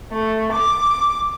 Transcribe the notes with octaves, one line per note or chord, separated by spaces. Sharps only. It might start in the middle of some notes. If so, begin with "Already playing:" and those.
A3
D6